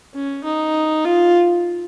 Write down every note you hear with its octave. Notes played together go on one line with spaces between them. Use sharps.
C#4
D#4
F4